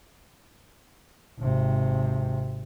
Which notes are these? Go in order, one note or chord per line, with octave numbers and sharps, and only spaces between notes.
G#1 C3